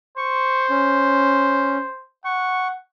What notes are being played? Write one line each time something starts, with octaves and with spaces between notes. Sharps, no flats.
C5 C#6
C#4
F#5 C#6